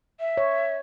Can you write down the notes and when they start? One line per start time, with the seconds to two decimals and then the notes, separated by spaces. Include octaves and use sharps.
0.20 E5
0.37 C#5